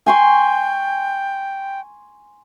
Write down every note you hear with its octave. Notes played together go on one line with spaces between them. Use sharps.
G5 G#5 C6 C#6